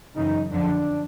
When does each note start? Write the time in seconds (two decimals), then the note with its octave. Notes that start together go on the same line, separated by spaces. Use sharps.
0.15 F#2 C#3 E3 D#4
0.51 F2 D3 F3 D4